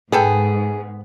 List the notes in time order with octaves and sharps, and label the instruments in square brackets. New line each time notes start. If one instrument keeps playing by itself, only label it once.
[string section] G#2 [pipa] B3 A4 G5 [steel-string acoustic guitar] G#4